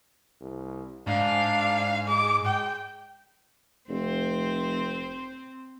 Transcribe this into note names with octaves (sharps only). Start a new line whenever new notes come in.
C2
G#2 D4 F5
G#3 D6
G5
F1 C4 C5